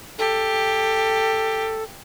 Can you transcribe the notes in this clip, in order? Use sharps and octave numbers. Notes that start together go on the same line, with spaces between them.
G4 A4